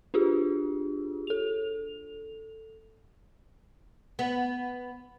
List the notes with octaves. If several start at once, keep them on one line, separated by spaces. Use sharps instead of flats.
D4 F4 G4 G#4
A4 F7
B3